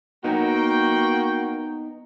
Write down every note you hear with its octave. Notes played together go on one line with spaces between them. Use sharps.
A#3 B3 D#4 F#4 G5